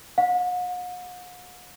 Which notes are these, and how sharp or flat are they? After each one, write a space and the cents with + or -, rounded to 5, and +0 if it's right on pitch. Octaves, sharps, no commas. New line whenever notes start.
F#5 -45